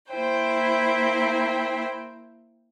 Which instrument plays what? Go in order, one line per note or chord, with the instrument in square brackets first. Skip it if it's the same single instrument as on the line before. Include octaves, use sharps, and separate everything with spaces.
[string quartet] A#3 E4 C5 G5